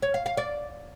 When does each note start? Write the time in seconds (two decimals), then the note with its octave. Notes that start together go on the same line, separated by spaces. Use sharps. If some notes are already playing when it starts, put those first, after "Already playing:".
0.02 C#5
0.14 F5
0.26 F5
0.37 D5